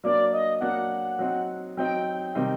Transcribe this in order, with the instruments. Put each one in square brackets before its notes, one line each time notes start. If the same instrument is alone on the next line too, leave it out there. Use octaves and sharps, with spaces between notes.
[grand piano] F#3 A#3 D4 [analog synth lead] D5
[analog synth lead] D#5
[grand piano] F#3 A#3 D4 [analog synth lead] F#5
[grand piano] F#3 C4 D#4
[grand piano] F#3 C4 D#4 [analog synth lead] G5
[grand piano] C3 D#3 G3 C4 D#4